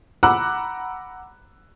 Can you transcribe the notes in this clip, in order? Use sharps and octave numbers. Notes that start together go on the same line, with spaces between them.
F#5 A#5 B5 D6 E6 F#6